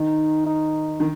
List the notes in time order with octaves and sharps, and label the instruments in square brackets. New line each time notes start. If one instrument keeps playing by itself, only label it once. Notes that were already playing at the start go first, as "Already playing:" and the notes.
Already playing: [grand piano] D#3 [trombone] D#4
[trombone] D#4
[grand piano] D#3